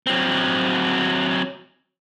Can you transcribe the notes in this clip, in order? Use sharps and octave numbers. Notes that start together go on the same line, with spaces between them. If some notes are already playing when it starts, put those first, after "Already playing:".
F#3 C4